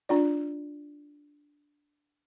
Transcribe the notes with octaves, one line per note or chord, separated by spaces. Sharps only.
D4 F4 D5